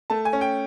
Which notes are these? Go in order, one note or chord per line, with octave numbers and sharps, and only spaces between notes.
A3 A5
G#5
C#4
G5